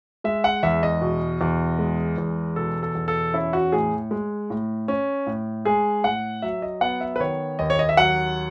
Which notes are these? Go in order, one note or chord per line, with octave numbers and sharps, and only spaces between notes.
G#3 E5
F#5
E2 E5
D#5
B2
E2
G#3
E2
B2 A4
A4
E2
A4
C#4 E4
F#4
A2 G#4
G#3
A2
C#4
A2
G#3 G#4
A2 F#5
F#3 E5
D#5
B3 F#5
E5
B4
D#3 C#5
D#2 D#5
C#5
D#5
E5
F#3 F#5